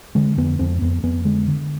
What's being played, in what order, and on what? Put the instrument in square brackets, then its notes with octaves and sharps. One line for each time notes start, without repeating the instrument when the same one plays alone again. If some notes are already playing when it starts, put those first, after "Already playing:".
[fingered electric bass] D3 G#3
F2 B3
F2 C4
F2 B3
F2 B3
D3 G#3
D3